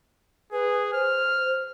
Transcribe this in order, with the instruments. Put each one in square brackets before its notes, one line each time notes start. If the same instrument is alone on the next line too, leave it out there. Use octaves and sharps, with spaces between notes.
[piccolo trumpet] G#4 [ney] B4
[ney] C5 [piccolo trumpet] F6